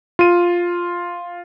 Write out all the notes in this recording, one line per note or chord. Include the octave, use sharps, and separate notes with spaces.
F4 D#7